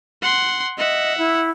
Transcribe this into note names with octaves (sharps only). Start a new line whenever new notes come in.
F#5 C6
D#5 E5 F#5
E4